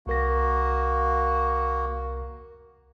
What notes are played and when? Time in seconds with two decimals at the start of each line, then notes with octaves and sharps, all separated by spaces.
0.07 C2 A#3 F#4 A#4 A#6